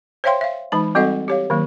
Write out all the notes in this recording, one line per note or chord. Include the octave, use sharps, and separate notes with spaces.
C5 C#5 E5 F5 G5 C6
E5 F5
E3 G#3 D#4 B5
G3 C4 F#4 A4 D#5 F#5
G4 C#5 F5
D#3 F#3 A#3